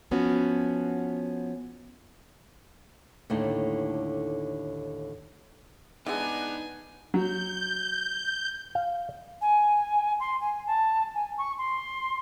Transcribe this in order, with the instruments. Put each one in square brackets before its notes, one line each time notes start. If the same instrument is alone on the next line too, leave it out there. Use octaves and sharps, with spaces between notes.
[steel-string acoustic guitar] F3 B3 C#4 F#4
[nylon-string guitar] D#2 A2 D3 A3 D#4
[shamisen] E3 G#3 [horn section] B3 D4 [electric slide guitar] D#4 [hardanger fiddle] G#5
[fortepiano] F#3 [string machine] G6
[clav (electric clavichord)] F5
[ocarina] G#5
C6
G#5
A5
G#5
C#6
C6